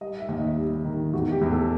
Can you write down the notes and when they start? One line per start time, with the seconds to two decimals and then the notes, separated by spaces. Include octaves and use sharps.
0.01 G3 D#5
0.20 E5
0.28 D#2
0.38 D#5
0.57 G3
0.85 D#3
1.13 E2 F#4
1.32 G4
1.41 E2
1.51 A4